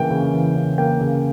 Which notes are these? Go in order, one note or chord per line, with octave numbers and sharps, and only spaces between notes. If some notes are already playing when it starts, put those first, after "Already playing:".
Already playing: C#3 E3 A#3 G5
C#3
E3
C#3
A#3 G5
C#3